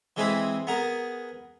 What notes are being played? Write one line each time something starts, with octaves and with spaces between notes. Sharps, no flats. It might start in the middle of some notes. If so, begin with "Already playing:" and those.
E3 G#3 C4 E4 B5 D#6
B3 G#4 A#4